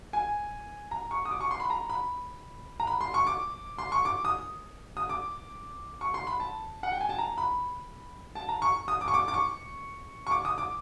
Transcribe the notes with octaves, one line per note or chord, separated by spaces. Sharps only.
G#5
A#5
C#6
D#6
D6
C#6
C6
B5
A#5
B5
A#5
B5
C6
C#6
D6
C6
C#6
D6
D#6
D#6
D6
C#6
C6
B5
A5
F#5
G5
G#5
A5
A#5
B5
A5
A#5
C#6
D#6
D6
C#6
D6
D6
C#6
C#6
D6
D#6
D6